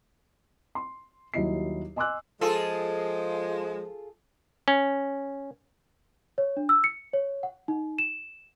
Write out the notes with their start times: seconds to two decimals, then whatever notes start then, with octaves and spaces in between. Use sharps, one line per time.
0.75 C6
1.34 D#2 F#3 G3 E4 D#5 C7
1.96 D#5 G#5 C6 D6 E6 F#6
2.41 F3 G#3 F4 G#4 A4
4.68 C#4
6.38 C#5
6.57 D4
6.69 E6
6.84 C#7
7.13 C#5
7.43 F#5
7.68 D#4
7.99 E7